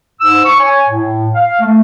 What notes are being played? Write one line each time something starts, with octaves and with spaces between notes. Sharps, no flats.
G#2 E6
C#6
C#5 G#5
A2
F5
A3